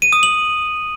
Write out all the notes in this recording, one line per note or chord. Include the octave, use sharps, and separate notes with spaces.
D#7
D#6
F#7